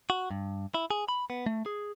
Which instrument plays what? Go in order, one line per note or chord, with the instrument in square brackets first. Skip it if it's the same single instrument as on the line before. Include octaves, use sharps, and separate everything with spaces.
[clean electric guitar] F#4
G2
E4
G#4
B5
B3
A3
G#4